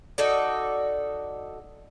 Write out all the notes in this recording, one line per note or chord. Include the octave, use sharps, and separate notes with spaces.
D#4 F#4 A4 D5